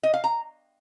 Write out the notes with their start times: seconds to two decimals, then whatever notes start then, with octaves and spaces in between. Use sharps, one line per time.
0.03 D#5
0.14 F5
0.24 A#5